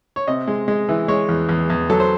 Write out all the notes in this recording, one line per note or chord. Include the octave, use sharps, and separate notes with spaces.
C#5
C3 D#5
G#3
G#3
E3
G#3 C#5
E2
E2
E2
F#3 A4
C5